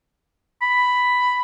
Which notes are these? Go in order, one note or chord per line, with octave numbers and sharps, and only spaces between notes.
B5